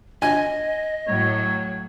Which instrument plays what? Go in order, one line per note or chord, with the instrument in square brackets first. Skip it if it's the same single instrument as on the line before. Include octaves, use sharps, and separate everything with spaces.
[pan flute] D#5 [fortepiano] G#5
[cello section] A2 F#3 [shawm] C#5